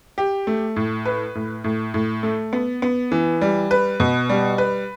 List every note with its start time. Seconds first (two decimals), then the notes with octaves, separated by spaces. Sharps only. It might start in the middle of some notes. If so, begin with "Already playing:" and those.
0.18 G4
0.47 A3
0.76 A2
1.05 B4
1.35 A2
1.64 A2
1.94 A2
2.23 A3
2.53 B3
2.82 B3
3.12 E3
3.41 G3
3.71 B4
4.00 B2
4.29 G3
4.58 B4